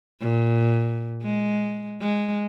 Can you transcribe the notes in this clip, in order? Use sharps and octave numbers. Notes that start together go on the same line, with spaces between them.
A#2
G#3
G#3